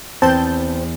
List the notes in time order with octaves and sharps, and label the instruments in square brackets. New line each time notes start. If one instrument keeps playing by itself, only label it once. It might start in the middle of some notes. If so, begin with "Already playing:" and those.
[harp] E2 [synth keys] C4 [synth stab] A5 G6